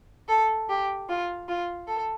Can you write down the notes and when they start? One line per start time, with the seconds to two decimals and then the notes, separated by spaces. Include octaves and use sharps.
0.29 A4
0.69 G4
1.09 F4
1.49 F4
1.87 A4